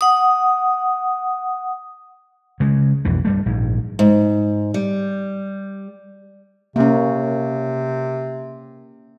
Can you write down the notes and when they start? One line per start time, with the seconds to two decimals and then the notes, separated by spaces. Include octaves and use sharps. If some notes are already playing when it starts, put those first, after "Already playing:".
0.01 F#5 D#6
2.60 C#3 G#3
3.05 B1 F2 E3
3.25 G2 G3 A3
3.46 A#1 G#2
3.99 G#2
4.74 G3
6.76 C3 A#3 C#4